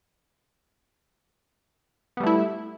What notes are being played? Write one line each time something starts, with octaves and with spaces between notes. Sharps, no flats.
G3 A3 B3 E4